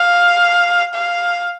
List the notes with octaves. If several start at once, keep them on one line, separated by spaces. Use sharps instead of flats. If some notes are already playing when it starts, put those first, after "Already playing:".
Already playing: F5
F5